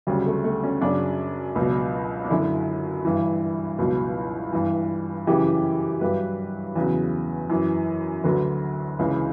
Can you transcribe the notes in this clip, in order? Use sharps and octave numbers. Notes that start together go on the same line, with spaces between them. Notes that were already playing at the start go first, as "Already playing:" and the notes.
D2 C#3 F#3 G3
A3
A3
C#4
F#2 C#3 F#3 D4
C#2 B2 F#3
D4
F#2 D3 F#3 E4
G2 E3
C#2 B2 F#3
G2 E3
F#2 C#3 E3 G4
G2 F#3 B4
E2 C#3 F#3
F#2 E3
D2 D3 F#3 B4
C#2 C#3 E3